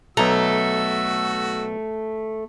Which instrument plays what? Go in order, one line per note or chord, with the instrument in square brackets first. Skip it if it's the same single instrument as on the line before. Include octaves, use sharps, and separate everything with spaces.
[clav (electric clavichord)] B1 A#5 [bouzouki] A3 [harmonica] F#4 E6